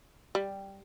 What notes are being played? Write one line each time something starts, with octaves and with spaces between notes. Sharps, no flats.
G3